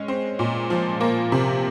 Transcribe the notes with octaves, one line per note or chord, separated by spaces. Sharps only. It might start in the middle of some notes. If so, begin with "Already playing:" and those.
Already playing: G#3 C#4
C4
A#2
F3
A#3
C3